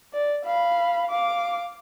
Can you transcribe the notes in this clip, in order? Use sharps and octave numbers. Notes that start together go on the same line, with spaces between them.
D5
F5 B5
F5 D6